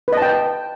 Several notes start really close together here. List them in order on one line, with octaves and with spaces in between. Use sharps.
B4 D#5 A5 G5